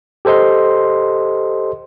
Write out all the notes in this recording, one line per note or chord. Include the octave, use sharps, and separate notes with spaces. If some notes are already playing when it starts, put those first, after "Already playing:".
G4 A4 C5 D#5 C6